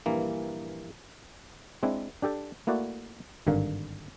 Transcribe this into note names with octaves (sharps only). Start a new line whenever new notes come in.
A#1 G2 E3 A#3
G#3 C4 D4 E4
D4 G4 A4 G5
A3 A#3 E4 F#4 D5
G#1 G2 D3 A#4 F5